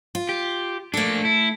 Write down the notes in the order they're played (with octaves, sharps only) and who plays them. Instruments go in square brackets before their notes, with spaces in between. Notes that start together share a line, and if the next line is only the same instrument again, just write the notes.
[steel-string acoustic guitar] F4
[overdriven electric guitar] G4
[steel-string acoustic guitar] A3 A4 [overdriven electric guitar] A#3 D4
[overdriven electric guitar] E4